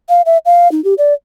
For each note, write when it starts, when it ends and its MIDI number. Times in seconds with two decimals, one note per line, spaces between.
0.09 0.22 77
0.26 0.38 76
0.45 0.70 77
0.72 0.83 63
0.84 0.94 67
0.98 1.13 74